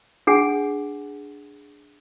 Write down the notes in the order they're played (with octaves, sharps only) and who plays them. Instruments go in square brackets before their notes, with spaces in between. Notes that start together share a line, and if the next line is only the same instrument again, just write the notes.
[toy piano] D4 G#4 F#5 G#5